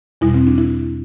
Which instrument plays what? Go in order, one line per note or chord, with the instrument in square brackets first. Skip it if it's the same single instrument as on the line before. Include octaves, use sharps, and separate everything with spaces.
[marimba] E2 B2 G3 E4
C4
D4
E4